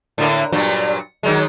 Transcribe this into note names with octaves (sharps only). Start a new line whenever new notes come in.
A2 D3 A#3
G2 A#2 F#3
D#3 F#3 G#3